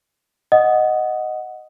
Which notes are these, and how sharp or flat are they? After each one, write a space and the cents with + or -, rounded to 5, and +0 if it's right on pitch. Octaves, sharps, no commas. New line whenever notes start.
D#5 +0 F#5 +0 D#6 +0